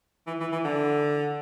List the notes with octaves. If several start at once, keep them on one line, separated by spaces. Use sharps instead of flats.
E3
E3
E3
D3